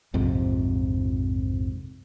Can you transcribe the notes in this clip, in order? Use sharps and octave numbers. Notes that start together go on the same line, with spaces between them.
A#1 F2 G#2 C3